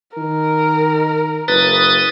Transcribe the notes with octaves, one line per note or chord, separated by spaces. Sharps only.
D#3 A#4
F#1 B4 D#6 A6